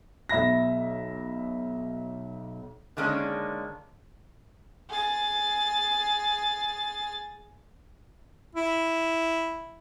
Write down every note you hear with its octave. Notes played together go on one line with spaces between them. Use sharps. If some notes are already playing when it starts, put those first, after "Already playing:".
B1 E5 B5 A#6
D3 D#3 G#3 A#3 C#4 D4
G#4 A6
E4